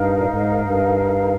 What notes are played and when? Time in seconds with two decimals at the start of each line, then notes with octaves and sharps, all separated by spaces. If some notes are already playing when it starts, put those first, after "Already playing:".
Already playing: G2 D#4 A#4 F5
0.16 A#2
0.25 G#2
0.60 G2